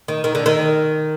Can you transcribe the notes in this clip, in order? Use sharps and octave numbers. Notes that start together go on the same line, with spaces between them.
D#3
D#3
D3
D#3